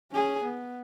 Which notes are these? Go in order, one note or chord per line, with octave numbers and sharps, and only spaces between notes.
C#4 G#4
B3